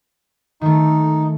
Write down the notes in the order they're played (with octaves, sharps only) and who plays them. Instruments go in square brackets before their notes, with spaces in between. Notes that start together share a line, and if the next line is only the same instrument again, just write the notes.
[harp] D#3 A3 [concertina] D#4